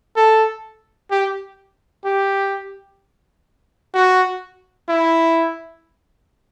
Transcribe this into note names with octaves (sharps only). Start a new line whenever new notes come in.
A4
G4
G4
F#4
E4